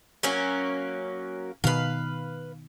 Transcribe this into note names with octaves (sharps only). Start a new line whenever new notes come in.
F#3 A#3 C#4
B2 D#3 B4 F5